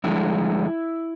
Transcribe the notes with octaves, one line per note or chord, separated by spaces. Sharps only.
G2 D3 F3 G#3 E4